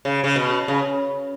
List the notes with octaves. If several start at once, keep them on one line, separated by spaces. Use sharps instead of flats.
C#3
C#3
B2
C#3